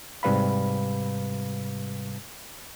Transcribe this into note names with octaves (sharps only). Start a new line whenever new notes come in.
G#2 C3 G3 B4 F5 B5